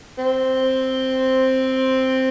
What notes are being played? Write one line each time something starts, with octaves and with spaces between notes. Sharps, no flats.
C4